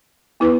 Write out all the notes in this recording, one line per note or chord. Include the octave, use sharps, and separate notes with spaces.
B3 E4 B4